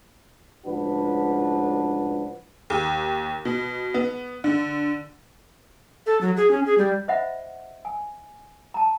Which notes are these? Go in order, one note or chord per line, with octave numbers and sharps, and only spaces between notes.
C#2 A2 F3 D4 F#4 B4
D#2
B2
B3
D3
A4
F#3
G#4
C#4
G#4
G3
C5 D#5 E5 F#5 B5
G#5
A5 A#5